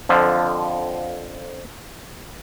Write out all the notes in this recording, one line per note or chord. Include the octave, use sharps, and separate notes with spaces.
F2 D3 F3